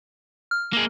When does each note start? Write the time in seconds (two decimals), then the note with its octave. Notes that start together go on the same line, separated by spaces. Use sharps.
0.51 F6
0.73 A#3 G#4